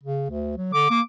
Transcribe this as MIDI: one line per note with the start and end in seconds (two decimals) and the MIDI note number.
0.03 0.26 49
0.30 0.56 38
0.57 0.73 54
0.73 0.89 50
0.73 0.86 86
0.90 1.01 58
0.90 1.00 86